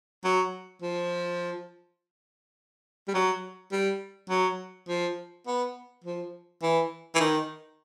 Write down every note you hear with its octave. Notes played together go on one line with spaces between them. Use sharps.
F#3
F3
G3
F#3
G3
F#3
F3
B3
F3
E3
E3
D#3